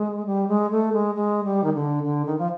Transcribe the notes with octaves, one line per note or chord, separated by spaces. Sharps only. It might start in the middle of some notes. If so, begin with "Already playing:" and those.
Already playing: G#3
G3
G#3
A3
G#3
G#3
G3
D#3
D3
D3
D#3
F3